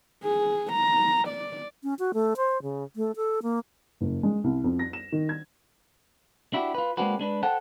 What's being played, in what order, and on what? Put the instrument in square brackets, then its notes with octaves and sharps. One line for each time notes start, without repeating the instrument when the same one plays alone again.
[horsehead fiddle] G#4
A#5
D5
[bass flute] C#4
F#4
A3
C5
C#3
A3
A4
A#3
[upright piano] F#1
G#3
C2
F2
A#6
E7
D#3
G#6
[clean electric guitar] D4 E4 F#4 G4
F4 B4
G#3 A#3 C4 D4 F#4 B4
G#3 D4 B4
A4 C5 F#5 G5 A5